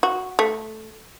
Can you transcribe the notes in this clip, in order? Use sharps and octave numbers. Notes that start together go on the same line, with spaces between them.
F#4
A3